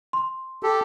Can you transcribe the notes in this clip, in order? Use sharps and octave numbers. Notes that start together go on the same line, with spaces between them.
C6
G4 A4